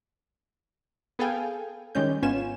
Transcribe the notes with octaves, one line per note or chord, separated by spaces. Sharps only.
B3 G#4 A4 F5 G5 G#5
D#3 G3 G#3 C#4 G6
G#1 B3 C#4 F4 G#5 E7